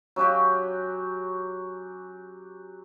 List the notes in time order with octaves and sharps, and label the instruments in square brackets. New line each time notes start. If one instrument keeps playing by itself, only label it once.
[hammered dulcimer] F#3 C#4 F#4 G4